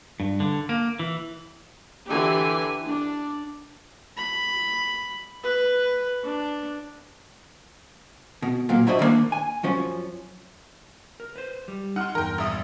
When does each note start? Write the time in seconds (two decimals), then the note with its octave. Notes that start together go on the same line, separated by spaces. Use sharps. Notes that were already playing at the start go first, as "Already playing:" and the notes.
0.20 G2
0.40 D3
0.69 A#3
0.99 E3
2.10 D3 E3 G4 G#5
2.86 D4
4.17 B5
5.44 B4
6.24 D4
8.42 B2
8.69 A#2 F#3 A#3
8.87 D4 E4 F#4 C5 D5 D#5
8.99 D3 D#3 A#3 D4
9.32 G#5
9.63 F#2 F3 C#4
11.20 A#4
11.36 B4 C5
11.68 G3
11.96 D#4 F#5 C6 F6
12.15 E2 G2 A#4 G5
12.38 A#1 E5 D#6